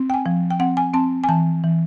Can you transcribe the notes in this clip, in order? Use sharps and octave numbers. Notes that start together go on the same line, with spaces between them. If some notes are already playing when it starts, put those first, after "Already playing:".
Already playing: C4
G5
G#5
F3
G5
C4 F#5
G#5
C4 A5
G#5
E3 A5
E3